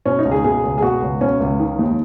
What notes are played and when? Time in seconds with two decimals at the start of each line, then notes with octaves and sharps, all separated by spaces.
0.06 B2 C#4
0.19 D#4
0.25 C#2
0.31 G#4
0.44 B2 G#4
0.64 C#2
0.78 G#4
0.82 B2 F#4
1.01 C#2
1.21 B2 C#4
1.40 C#2
1.59 D#3
1.79 D#2